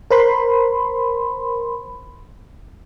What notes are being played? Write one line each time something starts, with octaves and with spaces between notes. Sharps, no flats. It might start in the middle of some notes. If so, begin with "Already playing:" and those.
A#4 C5 B5 C6